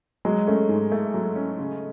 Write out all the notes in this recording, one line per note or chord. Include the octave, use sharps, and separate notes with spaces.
F#3 G#3
A3 C#4
G#2
A3
F#3
C#4
C#3